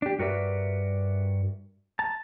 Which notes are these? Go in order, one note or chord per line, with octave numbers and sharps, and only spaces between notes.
D4 G4
G2 F#4 A#4 B4 D5 E5
A5 A#5